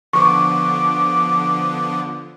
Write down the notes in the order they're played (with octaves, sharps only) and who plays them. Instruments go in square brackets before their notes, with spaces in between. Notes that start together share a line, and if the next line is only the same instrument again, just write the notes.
[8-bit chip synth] D3 F3 B3 [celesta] C#6 [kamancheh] D6